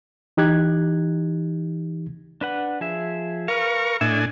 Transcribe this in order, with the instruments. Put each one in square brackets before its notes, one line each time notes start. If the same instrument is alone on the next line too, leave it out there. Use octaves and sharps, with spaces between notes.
[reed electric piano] E3 D#4 G4 F#6 G#6
[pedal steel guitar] D4 B4 F#5
F3 G#4 E5
[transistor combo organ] A#4 C#6 [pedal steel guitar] B4 F5
[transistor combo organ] A2 D4 G#5 [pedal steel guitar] D#5 E5